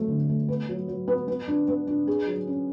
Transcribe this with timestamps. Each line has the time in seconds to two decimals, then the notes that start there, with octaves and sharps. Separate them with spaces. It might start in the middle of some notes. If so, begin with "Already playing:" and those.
Already playing: F#3 A3
0.08 D3
0.29 A3
0.48 B3
0.69 F#3
0.88 F#3
1.08 B3
1.28 B3
1.48 D4
1.68 B3
1.87 D4
2.07 G#4
2.27 F#3
2.47 C#4